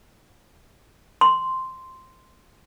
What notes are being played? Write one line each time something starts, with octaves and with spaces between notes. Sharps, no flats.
C6